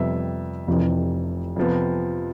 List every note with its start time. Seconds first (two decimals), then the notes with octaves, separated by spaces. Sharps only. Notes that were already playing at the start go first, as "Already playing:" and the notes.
Already playing: F2 C3 G3 B3 E5
0.67 F1 F2 C3 E3
1.56 F2 C3 F3 B3